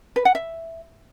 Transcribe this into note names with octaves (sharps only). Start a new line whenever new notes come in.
B4
F#5
E5